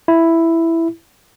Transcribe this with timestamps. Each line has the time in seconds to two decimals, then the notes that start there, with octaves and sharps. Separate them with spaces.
0.08 E4